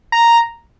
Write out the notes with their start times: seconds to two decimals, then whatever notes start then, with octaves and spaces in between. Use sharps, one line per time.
0.12 A#5